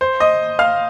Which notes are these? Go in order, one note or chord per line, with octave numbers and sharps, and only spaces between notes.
C5
D#5 D#6
F5 F6